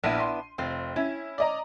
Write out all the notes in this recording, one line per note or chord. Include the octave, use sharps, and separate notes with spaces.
A#1 B3 D4 E4 D#7
C6
F1 C4 F4
C#4 E4
D5 D#5 A#5